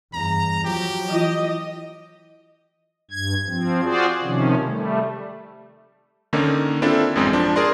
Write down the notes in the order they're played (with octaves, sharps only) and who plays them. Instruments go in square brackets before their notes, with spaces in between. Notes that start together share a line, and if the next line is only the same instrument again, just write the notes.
[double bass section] E2 G2 [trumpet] A#5
[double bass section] F3 F#3 [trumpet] G4
[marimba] E3 E4 F4 [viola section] D#5
[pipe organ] G2 G#6
F3 C4
F4 F#4 G#4 C5 D5
C3 D#3 F3 C#4
G3 A3
[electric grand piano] D3 D#3 A#3 C#4 D#4
C4 D4 E4 F4 A4
A1 F#2 G#3 C4
F3 D4
G#4 A#4 D5 C6